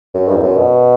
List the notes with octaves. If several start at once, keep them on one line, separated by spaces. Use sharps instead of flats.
F#2
G2
E2
F#2
B2